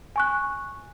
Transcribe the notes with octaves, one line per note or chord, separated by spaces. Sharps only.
G#5 C#6 F#6